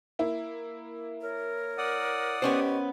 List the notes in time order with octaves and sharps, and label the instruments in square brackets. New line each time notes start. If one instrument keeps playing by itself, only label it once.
[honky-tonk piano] A#3 E4
[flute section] A#4 C#5
[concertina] D5 F#5 D#6
[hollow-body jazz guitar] B3 C#4 C5 [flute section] G4 D#5 C#6